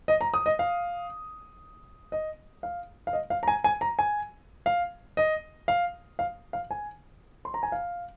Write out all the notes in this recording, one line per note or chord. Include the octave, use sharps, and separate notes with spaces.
D#5
A#5
D#6
D#5
F5
D#5
F5
F5
D#5
F5
A#5
G#5
G#5
A#5
G#5
F5
D#5
F5
F5
F5
G#5
C6
A#5
G#5
F5